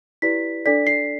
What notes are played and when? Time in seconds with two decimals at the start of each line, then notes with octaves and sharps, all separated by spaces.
0.22 E4 G4 B4 D5 B6
0.66 D4 A4 D5 B6
0.87 C7